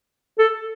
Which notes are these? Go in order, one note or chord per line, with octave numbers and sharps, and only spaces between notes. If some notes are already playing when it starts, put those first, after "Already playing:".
A4